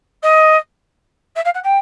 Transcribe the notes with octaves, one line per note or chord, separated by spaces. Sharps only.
D#5
E5
F5
F#5
G5